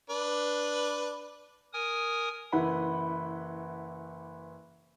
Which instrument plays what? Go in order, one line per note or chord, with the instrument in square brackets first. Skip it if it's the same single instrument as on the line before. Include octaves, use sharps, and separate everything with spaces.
[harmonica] D4 B4
[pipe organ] A#4 G#5 D#6
[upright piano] F#1 E3 E4 B4 F#5 B5